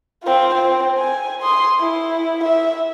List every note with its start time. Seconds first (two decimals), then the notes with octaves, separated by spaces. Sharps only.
0.24 C4 F4
0.55 C4
0.98 G#5
1.42 C6 D#6
1.79 E4
2.44 E5